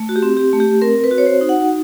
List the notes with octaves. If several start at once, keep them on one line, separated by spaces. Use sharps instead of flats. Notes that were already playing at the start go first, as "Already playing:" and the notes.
Already playing: A3
F#4
G4
C4
G4
A3
G4
C4 A#4
B4
F#4
C#5
C5
D#4
F#5